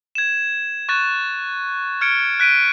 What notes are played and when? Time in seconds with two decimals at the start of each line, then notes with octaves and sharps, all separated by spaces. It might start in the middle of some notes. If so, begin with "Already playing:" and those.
0.15 G#6 E7
0.89 C#6 F#6 A6 E7
2.01 F6 G#6 C#7 D7
2.40 F#6 B6 D7 D#7